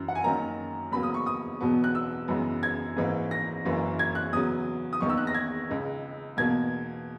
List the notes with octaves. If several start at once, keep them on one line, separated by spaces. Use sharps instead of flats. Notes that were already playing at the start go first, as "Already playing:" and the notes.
Already playing: F#2 E3
F#5
G#5
F#2 D#3 F#3 A#3 A#5
E2 C#3 F#3 A#3 B5
D#6
C#6
D#6
E2 B2 F#3 B3
F#6
E6
F#2 C#3 E3 G#3 B3
G#6
G#1 G#2 E3 A#3
A#6
F#1 F#2 E3 A#3
G#6
F#6
E2 C#3 F#3 D#6
D#6
E2 D#3 A#3 C#6
E6
F#6
A#6
G#6
C#2 C#3 G#3
E2 B2 A#3 G#6